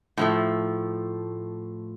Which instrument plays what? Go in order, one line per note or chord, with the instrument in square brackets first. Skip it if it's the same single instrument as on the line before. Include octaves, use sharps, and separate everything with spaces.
[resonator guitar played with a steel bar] A2 F3 A3